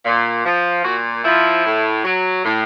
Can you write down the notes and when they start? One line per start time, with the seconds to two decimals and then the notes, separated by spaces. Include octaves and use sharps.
0.05 A#2
0.44 F3
0.83 A#2 F#4
1.24 F3 E4
1.64 A2
2.03 F#3
2.44 A2